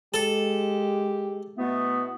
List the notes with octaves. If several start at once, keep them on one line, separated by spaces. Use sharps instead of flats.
G#3 G4 A4
B2 A3 B3 E4